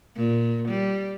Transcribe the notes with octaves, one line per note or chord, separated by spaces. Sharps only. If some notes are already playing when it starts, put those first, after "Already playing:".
A#2
G3